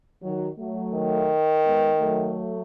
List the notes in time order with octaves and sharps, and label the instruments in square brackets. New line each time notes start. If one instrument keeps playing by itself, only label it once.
[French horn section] D#3 F#3
F#3 A3
[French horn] D#3
[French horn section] G#3 B3
F#3 A3